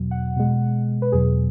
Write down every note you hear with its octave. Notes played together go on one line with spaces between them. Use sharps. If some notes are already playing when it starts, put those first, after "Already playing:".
Already playing: E2 B2 F#3
F#5
B2 G#3
B4
E2 B2 F#3 G#4